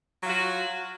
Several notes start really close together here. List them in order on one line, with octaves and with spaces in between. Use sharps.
F#3 F4 F#4